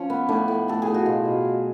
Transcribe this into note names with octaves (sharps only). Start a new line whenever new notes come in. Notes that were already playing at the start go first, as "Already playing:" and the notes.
Already playing: F3 C#4 F4
B3
A2 D4
A2
A2 A4
G#4
A2
F#4
B2 F4
B2
F#3